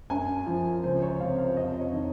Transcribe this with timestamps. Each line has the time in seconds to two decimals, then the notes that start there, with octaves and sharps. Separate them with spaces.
0.10 F#2 G#5
0.47 F3
0.83 C#2 C5
1.02 C#5
1.20 C3 F5
1.38 F5
1.57 F2 D#5
1.81 C#5
1.93 D#3